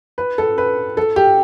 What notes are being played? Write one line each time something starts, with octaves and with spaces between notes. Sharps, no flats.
B4
A4
B4
A4
G4